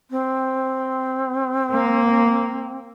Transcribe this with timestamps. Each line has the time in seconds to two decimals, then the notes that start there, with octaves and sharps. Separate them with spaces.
0.11 C4
1.72 A#3